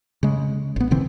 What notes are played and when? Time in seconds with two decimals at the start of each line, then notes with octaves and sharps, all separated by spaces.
0.23 C#3 G#3
0.76 G#1 B3
0.91 B2 D3 E3 C4